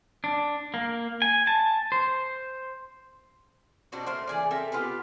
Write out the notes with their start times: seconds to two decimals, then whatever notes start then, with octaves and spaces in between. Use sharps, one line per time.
0.24 D4
0.74 A#3
1.22 G#5
1.47 A5
1.92 C5
3.92 B2 C4 D4 F#4
4.06 A3 A#3 C5
4.27 E3 G#4 D5
4.51 C4 A4 A#4 E5
4.72 B3 F4 G4 B4